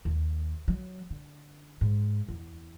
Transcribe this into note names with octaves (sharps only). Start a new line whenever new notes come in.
D#2
F#3
D3
G#2
E2